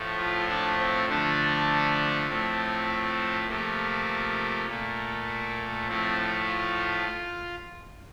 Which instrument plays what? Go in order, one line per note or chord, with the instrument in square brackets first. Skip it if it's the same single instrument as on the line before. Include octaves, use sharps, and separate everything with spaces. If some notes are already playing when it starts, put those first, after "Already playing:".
Already playing: [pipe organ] A2 F3 A3
F4
D4
C4
D3 F3 A3 D4
A2 F3 A3 C4
C3 F3 A3 A#3
A#2 A3
A2 F3 A3 C4
F4